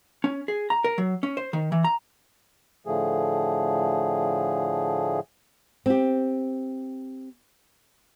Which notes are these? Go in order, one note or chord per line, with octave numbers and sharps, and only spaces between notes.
C#4
G#4
A#5
A#4
F#3
C#4
C5
D#3
E3
A#5
A2 D3 F3 A3 G#4
C4 G4